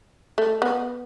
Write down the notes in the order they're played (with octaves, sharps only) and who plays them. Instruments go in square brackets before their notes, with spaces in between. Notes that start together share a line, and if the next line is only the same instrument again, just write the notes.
[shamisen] A3
B3